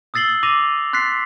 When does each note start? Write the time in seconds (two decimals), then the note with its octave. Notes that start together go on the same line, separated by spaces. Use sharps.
0.14 D#6 E6 A6 C7 F#7 G7
0.43 D6 A#6 D#7 F7
0.93 C6 F#6 A6 B6 C7